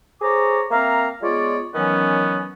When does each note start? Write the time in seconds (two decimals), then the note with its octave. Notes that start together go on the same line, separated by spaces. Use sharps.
0.22 G#4 A4 C5 C#5 A#5 D6
0.71 A#3 C4 E5 F5 A#5
1.22 G#3 B3 F4 C#5 D5
1.74 D#3 E3 F#3 B3 C#4